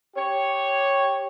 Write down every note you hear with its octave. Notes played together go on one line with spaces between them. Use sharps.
G4 C#5